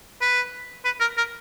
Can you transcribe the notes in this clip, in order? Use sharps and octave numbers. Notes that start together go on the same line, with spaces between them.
B4
B4
A#4
A#4